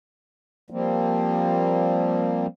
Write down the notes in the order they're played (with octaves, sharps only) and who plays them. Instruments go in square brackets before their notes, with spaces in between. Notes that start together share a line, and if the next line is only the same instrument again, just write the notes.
[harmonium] F3 G3 A#3 C4